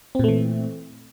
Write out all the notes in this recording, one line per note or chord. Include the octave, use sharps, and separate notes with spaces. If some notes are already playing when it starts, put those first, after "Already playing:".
A#2 E3 A3 C4